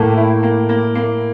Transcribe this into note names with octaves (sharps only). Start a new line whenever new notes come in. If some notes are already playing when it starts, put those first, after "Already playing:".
Already playing: A2 A#3
E4
A#3
A#3
A#3